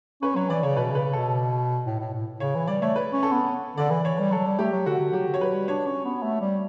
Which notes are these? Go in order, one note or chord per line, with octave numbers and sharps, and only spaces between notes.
C#4 B4
F#3 C#5
E3 D5
C#3 C#5
B2 B4
C#3 B4
C#3
B2 A4
A2
A2
A2
C#3 C#5
E3
G3 D5
A3 C#5
B4
C#4
A4
B3
D3 D5
E3
E3 C#5
G3
F#3 A4
G3
A3 G4
F#3
D3 F#4
D3
F#3 G4
D3
C#5
F#3 B4
G3
D4 C#5
C#4
B3
A3
G3